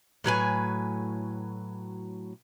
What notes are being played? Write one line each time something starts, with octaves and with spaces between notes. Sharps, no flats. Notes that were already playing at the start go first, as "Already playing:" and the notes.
A2 F#3 B4 G#5